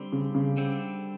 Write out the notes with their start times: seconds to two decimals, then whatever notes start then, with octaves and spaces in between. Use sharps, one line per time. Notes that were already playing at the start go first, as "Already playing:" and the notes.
Already playing: D3 G3 C4
0.12 C#3
0.35 C#3
0.57 D3 G3 C4